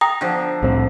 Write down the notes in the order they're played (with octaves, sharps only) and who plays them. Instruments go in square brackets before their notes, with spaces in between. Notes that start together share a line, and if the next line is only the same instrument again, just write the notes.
[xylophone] G5 D#6 [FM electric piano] A#5
[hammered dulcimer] D3 F3
[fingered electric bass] C2 A2 C4